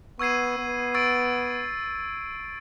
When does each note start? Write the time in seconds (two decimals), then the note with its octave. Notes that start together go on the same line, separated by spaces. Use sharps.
0.19 B3 C#6 E6 G#6 C7 D#7
0.58 B3
0.94 C#6 E6 A6 D7